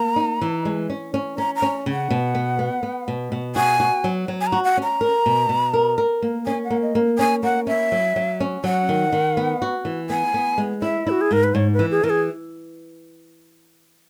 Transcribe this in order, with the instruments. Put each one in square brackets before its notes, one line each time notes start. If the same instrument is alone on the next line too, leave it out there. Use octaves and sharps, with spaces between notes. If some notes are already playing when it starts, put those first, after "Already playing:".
Already playing: [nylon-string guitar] A#3 [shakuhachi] A#5
[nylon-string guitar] D#4
E3
G#3
C#4
C#4
[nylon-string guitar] C#4 [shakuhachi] A#5
[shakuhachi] A#5
[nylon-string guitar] C#4
C#3
[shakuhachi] F#5
[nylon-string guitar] B2
B3
B3
B3
B2
B2
[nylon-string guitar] F#4 [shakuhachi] G#5
[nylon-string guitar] F#4
F#3
F#3
[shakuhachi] G#5
A#5
[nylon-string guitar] F#4
[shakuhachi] F#5
[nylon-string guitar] C#4
[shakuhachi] A#5
[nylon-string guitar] A#4
B2
B2
A#4
A#4
A#3
[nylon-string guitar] C#4 [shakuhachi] G#5
[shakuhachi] F#5
[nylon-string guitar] A#3
[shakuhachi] D#5
[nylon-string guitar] A#3
[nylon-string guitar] C#4 [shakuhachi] G#5
[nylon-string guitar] A#3 [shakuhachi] F#5
[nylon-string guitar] C#4 [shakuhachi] E5
[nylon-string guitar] F#3
F#3
C#4
[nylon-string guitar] F#3 [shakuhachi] F#5
[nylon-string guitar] D#3
D#3
B3
F#4
E3
[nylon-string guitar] B3 [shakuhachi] G#5
[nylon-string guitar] B3
G#3
[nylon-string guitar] E4 [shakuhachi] E5
[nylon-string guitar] E4 [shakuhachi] F#4
[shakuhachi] G#4
[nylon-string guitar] G#2 [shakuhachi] A#4
[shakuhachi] B4
[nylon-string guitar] G#2 [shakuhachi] C#5
[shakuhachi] B4
[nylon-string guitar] E3
[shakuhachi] G#4
[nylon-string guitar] E3 [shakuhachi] A#4
[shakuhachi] G#4